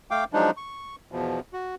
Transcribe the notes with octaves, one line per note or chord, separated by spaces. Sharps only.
A3 F5 G5 D6
F3 F#3 G#3 D4 D#4
C#6
E2 B2 F3
F#4